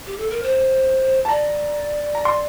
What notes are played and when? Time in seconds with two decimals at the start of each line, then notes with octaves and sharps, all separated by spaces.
0.06 G4
0.18 A4
0.31 A#4
0.43 C5
1.25 A5
1.28 D5 A#5
2.15 A#5
2.25 C6